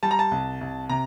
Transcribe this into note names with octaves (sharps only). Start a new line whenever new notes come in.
G3 A5
A#5
A5
C2
C2
C3 A#5